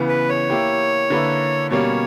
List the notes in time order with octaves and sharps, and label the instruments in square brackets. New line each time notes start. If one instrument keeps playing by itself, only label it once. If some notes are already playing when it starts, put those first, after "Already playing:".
Already playing: [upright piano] C#3 E3 B3
[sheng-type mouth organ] B4
C#5
[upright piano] A#3 E4 G4
D3 A#3 E4 B4
[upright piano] B2 G3 A#3 C#4 [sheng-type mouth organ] C#5